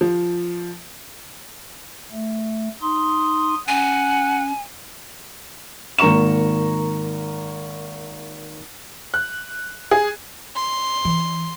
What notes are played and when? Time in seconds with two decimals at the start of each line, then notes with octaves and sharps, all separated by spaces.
0.01 F3
2.12 A3
2.82 D#4 C6 D#6
3.68 C#4 F#5 G#5
5.98 G#1 A#3 A#5 C#6 E7
9.14 F#6
9.91 G#4
10.56 C6
11.05 E3